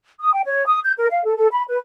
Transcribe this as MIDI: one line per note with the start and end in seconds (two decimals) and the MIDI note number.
0.20 0.31 87
0.33 0.41 79
0.45 0.64 73
0.66 0.80 87
0.85 0.93 91
0.97 1.07 70
1.12 1.22 77
1.24 1.35 69
1.37 1.47 69
1.52 1.63 83
1.69 1.78 71